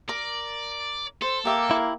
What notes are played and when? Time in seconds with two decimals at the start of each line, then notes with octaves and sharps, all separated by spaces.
0.09 A#4 D5
1.22 A4 C5
1.45 A#3 G4 E5 D6
1.71 E4